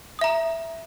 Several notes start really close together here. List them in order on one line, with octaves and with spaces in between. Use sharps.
D#6 E5 A#5